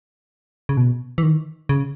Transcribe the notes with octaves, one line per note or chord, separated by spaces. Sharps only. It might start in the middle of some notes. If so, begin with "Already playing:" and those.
C#3
B2
E3
D#3
C#3